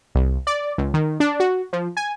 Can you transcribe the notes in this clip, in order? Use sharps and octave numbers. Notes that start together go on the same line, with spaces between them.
C2
D5
C#2
D#3
D4
F#4
F3
G#5